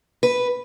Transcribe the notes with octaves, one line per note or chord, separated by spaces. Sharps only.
B4